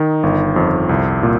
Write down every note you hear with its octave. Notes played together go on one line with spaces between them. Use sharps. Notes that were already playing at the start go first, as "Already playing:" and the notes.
Already playing: D#3 D#4
G1
F2
C2
A#2